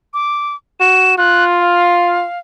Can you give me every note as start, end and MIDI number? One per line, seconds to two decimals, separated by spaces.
0.14 0.55 86
0.80 1.13 66
0.80 1.15 100
1.18 2.25 65
1.18 1.44 90
1.60 2.39 77